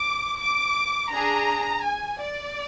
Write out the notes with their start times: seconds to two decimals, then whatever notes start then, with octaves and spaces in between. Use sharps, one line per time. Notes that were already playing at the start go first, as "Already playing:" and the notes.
Already playing: D6
0.40 D6
1.12 D4 G#4 A#5
1.84 G#5
2.21 D5